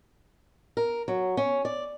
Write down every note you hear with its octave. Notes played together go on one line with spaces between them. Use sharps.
A#4
F#3
C#4
D5